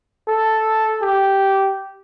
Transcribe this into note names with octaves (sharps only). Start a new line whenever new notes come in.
A4
G4